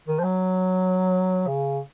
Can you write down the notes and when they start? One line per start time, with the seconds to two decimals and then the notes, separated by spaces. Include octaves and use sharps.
0.08 D#3
0.19 F3
0.24 F#3
1.47 C#3